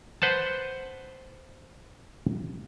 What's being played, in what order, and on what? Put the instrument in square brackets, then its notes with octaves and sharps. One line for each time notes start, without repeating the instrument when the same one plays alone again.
[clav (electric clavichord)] B4 C5 F#5 A5